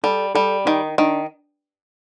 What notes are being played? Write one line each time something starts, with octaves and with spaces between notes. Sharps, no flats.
G3 A4
G3 A4
D#3 D#4
D#3 D4